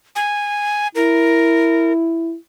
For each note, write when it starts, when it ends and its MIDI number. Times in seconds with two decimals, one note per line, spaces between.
0.16 0.88 80
0.95 2.35 64
0.95 1.92 70